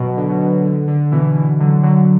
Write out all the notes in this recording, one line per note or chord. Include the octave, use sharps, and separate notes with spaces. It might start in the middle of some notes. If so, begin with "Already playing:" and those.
Already playing: B2 F#3
D3
B2
B2
D3
D3
D3
B2 E3
B2 E3
D3 F#3
D3 F#3